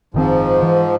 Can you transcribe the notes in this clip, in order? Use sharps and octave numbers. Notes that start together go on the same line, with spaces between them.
F#1 G#2 D#3 F3 C4
E3